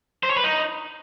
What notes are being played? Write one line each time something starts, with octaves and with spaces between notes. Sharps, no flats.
C5
C#5
B4
D#4